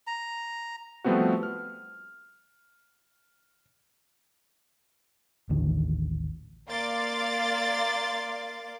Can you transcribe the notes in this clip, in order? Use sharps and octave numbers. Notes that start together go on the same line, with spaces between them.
A#5
F3 G3 A3 B3 C4 F#4
F6
A1 D#2 D3 D#3
A#3 D5 F5 C6 D6 A6